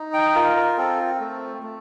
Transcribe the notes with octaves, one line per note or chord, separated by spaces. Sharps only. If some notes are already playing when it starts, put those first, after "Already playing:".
Already playing: D#4
G5
F4 A#4
A#4
C4 A4
A3
A3